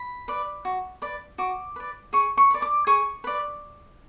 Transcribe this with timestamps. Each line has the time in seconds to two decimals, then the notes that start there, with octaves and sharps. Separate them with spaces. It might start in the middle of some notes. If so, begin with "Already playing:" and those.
Already playing: B5
0.28 B4 D5
0.65 F#4
1.02 B4 D5
1.38 F#4 D6
1.76 B4 D5
2.13 G#4 C#6
2.37 C#6
2.51 B4 D5
2.62 D6
2.87 G#4 C#6
3.24 B4 D5